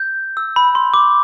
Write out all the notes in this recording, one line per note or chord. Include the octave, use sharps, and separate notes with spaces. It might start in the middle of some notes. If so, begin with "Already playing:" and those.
Already playing: G6
E6
B5
C6
D6